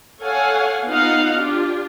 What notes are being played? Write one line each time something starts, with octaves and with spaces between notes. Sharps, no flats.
A4 C#5 F5 F#5 G#5
B3 D#4 F4 D#5 F5 F#5
D4 F4 G4